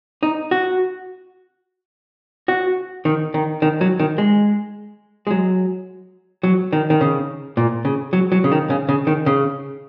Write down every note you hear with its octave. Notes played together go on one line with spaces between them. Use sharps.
D#4
F#4
F#4
D#3
D#3
D#3
F#3
D#3
G#3
G#3
F#3
F#3
D#3
D#3
C#3
A#2
C#3
F#3
F#3
C#3
D#3
C#3
C#3
D#3
C#3